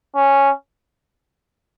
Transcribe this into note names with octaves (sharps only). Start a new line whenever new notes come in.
C#4